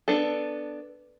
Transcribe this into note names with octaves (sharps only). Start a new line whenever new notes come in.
B3 D4 A4